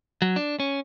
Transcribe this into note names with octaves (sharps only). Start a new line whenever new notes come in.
F#3
D4
C#4